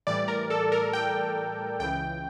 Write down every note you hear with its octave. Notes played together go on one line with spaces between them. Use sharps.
A2 E3 G3 D5
A#4
A4
A#4
G5
C#2 C#3 E3 G5